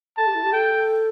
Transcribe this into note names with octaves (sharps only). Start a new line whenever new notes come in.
A4 A5
G4
E4
G4
A4 G5